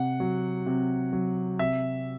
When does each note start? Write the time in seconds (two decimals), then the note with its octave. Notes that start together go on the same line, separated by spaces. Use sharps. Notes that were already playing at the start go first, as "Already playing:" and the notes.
Already playing: C3 F#5
0.20 F#3
0.66 C3
1.13 F#3
1.59 C3 E5